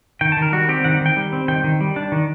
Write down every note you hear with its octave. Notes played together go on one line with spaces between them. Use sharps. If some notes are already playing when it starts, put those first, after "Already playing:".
D#3 G5
A5
D#3
A#4
G3 F#4
C4 G4
D#3 F#5
D#3 G5
G3
C4
D#3 G5
D#3
G3
D4
D#3